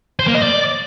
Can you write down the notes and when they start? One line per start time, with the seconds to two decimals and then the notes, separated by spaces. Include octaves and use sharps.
0.19 C5
0.27 A#3
0.35 D#5
0.42 D5